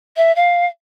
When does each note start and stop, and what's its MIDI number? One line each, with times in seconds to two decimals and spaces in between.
0.16 0.34 76
0.36 0.66 77